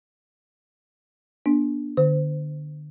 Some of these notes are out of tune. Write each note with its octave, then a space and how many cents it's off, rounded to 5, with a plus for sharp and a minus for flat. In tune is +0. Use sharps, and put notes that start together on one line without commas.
B3 -40 D4 +0
D3 +30 C5 -30